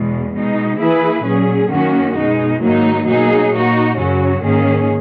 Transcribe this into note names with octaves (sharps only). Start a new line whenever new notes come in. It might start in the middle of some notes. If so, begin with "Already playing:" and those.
Already playing: E2 B2 G#3
B2 G#3 D#4
E3 A#3 E4 G#4 B4
A#2 F#3 C#4 G#4
F#2 D#3 A#3 C#4 F#4
B2 G#3 D#4
G#2 D#3 F#3 A#3 D#4
B2 F#3 A#3 D#4 G#4
A#2 A#3 D#4 F#4
F#2 C#3 F#3 C#4 F#4
G#2 D#3 A#3 C#4 G#4